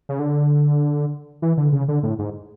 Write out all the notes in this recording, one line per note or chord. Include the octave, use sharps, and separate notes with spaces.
C#3
D3
E3
D3
C#3
D3
A2
G#2